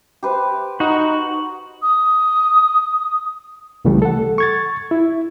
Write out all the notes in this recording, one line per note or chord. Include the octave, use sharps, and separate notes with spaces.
G4 B4 C5
D#4 F#4
D#6
C2 C#3 E3 G3 A3
A4 F#5
C#6 G#6 A6
E4